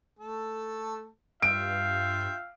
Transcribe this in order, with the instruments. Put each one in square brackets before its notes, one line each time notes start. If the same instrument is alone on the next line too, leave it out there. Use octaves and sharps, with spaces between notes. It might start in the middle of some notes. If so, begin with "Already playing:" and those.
[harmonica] A3 A4
[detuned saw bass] G2 [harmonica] F4 E5 G5 [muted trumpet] F5 [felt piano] D7